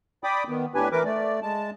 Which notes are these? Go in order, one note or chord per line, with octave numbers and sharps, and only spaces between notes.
D5 G5 B5 D6 D#6
D#3 B3
A2 D4 G4 B4 G#5
E3 A#4 B4 D6
A3 D5
G#3 A5